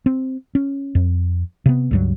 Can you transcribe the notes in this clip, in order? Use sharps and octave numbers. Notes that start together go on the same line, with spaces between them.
C4
C#4
F2
C3 B3
C#2 G2 F#3